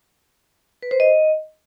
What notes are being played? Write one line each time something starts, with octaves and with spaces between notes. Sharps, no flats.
B4
C5
D#5